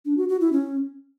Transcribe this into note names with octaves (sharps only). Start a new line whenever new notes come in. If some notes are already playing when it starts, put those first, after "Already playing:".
D4
F#4
F#4
E4
C#4